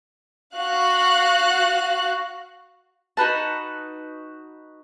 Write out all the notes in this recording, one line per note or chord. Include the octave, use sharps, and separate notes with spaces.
F#4 F5 F#6
D#4 F#4 B4 A5